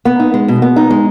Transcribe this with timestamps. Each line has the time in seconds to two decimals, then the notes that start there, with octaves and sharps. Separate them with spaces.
0.05 B3
0.20 D#4
0.34 G#3
0.48 B2
0.62 B3
0.76 D#4
0.90 G#3